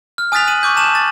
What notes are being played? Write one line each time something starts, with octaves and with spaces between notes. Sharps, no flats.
F6
G#5 D#6 F#6 A6 B6 F7
D#7 F#7
C#6 D6 G6
A5 E7 F#7
A6